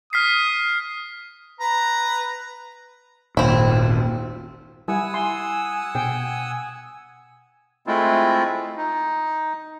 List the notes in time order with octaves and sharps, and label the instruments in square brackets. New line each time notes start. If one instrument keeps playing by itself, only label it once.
[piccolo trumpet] D#6 [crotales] F6 B6 C7
[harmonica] B4 A#5
[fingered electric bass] D#1 G#1 A#2 [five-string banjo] C4 E4
[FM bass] G3 [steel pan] E4 [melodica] F#5 D#6 E6 [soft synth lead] G#5
[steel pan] C6
[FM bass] B2 [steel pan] G5
[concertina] G#3 A3 C4 E4 F4
D#4